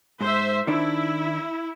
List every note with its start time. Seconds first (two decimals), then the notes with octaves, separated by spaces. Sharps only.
0.21 G#2 C5 E5
0.67 D#3 D4 E4